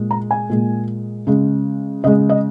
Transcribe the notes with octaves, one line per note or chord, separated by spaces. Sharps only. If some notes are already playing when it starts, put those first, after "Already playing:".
Already playing: A#2 G#3
A#5
G#5
A#2 G#3
C#3 G#3
C#3 G#3 D#5
D#5